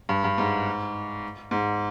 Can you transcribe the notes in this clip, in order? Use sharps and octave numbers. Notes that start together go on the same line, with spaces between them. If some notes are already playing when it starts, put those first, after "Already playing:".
G2
G2
G#2
G#2